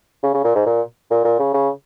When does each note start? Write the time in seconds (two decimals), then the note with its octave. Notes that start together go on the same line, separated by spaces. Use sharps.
0.23 C#3
0.34 C#3
0.44 A#2
0.55 G#2
0.66 A#2
1.11 A#2
1.25 A#2
1.39 C#3
1.54 C#3